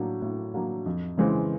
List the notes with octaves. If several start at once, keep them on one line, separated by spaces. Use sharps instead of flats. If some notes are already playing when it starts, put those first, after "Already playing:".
Already playing: A2 F#3 A#3 D4
A2
F#3 A#3 D4
F2
C#3 E3 G#3 C4